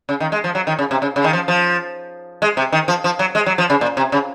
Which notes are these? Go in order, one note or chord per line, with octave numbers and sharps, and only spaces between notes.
C#3
D#3
G#3
F3
F#3
D#3
C#3
C3
C#3
C#3
D#3
F3
F3
G#3
C3
D#3
F3
F3
F#3
G#3
F#3
F3
C#3
A#2
C3
C#3